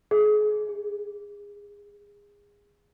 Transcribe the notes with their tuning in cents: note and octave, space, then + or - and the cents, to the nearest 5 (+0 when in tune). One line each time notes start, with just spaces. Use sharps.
G#4 +30
G#4 -25